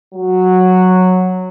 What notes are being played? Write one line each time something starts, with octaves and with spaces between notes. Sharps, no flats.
F#3